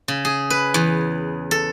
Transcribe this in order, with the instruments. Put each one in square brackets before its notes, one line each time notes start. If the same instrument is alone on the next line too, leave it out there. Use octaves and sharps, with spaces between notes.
[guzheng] C#3
G#4
B4
E2
A4